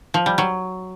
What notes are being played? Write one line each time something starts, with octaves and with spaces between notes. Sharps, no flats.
F3
G3
F#3